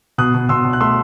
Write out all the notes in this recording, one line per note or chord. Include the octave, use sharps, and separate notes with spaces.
B2 D#6 F#6
B2
B2 C6 E6
B2
F#6
A3 C6 E6